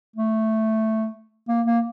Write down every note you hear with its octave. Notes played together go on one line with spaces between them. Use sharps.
A3
A#3
A#3